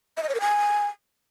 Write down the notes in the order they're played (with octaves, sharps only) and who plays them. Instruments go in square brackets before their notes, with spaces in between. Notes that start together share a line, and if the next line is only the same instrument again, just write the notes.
[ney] E5
D#5
C#5
A#4
G#5